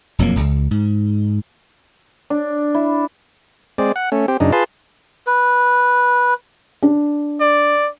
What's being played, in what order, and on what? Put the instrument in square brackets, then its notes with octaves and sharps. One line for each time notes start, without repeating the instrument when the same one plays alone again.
[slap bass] E1 F2 F#3 A#3
D1 C#2
G#2
[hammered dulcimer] D4
E4
[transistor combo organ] G#3 C4 D5
F#5
A3 C#4
C4 G4
F#2 C#3 D4 D#4
F4 G#4 B4 A5 C6
[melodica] B4
[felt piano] D4
[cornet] D5